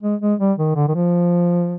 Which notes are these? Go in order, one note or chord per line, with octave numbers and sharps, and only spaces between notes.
G#3
G#3
G3
D#3
D3
D#3
F3